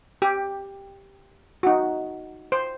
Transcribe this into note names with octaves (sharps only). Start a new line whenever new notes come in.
G4
D#4 F#4
C5